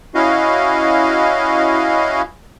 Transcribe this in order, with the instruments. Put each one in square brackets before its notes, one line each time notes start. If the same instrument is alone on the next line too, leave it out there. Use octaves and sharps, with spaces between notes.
[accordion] C#4 E4 F#4 D#5 F5